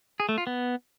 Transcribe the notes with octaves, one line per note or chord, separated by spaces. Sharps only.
G#4
A3
F4
B3